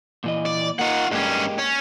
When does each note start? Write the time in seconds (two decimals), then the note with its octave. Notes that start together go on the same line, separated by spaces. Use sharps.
0.24 A#2 E3 D#5
0.46 D5
0.79 A#3 D#4 F4 F#5
1.11 G2 G#3 A#3 C#4 G4
1.58 C#4